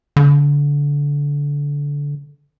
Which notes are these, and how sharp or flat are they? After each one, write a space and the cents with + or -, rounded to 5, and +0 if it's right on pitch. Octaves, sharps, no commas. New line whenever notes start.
D3 -25